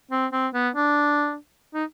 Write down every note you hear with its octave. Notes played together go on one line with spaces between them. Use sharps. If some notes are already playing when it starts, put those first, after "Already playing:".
C4
C4
B3
D4
D#4